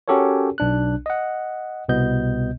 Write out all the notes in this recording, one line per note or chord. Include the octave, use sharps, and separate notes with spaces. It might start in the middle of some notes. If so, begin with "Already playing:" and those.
C#4 F#4 G4 A4 A#4 C#5
B1 D4 F#6
D#5 F#5
C2 B2 B3 D#5 G6